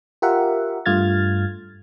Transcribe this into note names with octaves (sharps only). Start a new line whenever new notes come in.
F4 G4 A#4 E5 F#5
G2 A3 F4 F6 G#6 A6